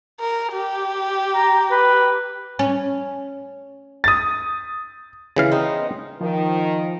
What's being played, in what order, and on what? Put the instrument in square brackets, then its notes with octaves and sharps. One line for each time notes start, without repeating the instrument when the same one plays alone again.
[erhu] A#4
G4
[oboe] A#5
B4
[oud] C#4
[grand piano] D#6 A6
[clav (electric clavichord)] C#3 E3 F5
[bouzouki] B3 C4 D#4
[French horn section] D#3 [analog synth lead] F3